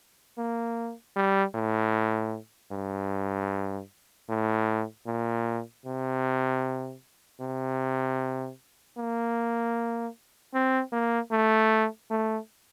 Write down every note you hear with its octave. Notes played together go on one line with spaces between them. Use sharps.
A#3
G3
A2
G2
A2
A#2
C3
C3
A#3
C4
A#3
A3
A3